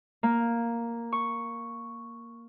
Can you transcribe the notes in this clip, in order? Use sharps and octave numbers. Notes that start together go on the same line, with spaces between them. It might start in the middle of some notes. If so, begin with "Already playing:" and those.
A#3
C#6